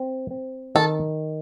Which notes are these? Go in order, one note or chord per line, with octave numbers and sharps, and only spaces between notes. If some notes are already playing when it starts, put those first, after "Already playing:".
Already playing: C4
C4
D#3 A4